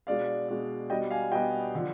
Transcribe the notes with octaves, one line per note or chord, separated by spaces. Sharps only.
B2 G#3 D4 D5 F5
B2 G#3 D4
B2 G3 B3 D4 D#5 G5
F5 G#5
B2 G3 B3 D4 D#5 G5
D3 F3